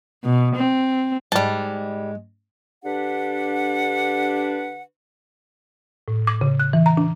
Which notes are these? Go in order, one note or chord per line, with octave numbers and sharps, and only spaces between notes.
B2
C4
G#2 G3 G#3 A5
D3 D4 G4 B4 F#5
A2
D6
C#3
F#6
E3
A#5
D4